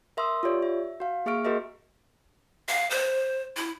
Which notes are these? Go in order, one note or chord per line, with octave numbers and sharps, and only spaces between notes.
A#4 E5 C6 D#6 E6
F4 G4 C#5 D5
E5
F#4 F5
A#3 G#4 E5 C#6 F6 D7
F#4 G#4 A#4 D#5 E5
F5
C5
E4